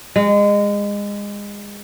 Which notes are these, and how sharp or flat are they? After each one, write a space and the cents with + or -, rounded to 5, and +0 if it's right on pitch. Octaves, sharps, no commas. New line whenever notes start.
G#3 -25